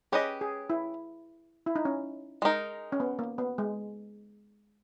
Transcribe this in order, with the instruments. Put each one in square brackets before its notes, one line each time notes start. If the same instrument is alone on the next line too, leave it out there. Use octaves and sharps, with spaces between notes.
[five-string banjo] C#4 G4 B4 D#5 [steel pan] G#4
[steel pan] G#4
E4
E4
D#4
C#4
[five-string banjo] G#3 D#4 A#4
[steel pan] C#4
B3
A#3
B3
G#3